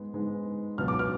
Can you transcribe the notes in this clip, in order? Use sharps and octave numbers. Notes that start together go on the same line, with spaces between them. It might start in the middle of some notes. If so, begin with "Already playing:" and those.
Already playing: G#2 G#3 B3
G#2 G#3 B3
C#2 B2 F#3 B3 F6
D6
F6